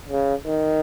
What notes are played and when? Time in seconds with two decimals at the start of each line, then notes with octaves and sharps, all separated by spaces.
0.09 C#3
0.46 D#3